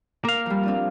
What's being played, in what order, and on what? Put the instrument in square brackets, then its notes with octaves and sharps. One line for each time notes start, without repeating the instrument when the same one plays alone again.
[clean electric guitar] A#3 F5 [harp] A#4
[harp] F3 G3
C4 D4 F4